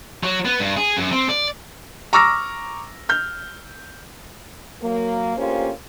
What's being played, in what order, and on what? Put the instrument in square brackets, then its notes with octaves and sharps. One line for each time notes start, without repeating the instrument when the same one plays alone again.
[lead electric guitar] F#3
B3
G2
G#4
F#2
C4
D5
[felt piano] A#5 C#6 D6 E6 F6 A#6
F6 G6
[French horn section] F#3 A#3
D2 A#3 C#4 F4 G4 C5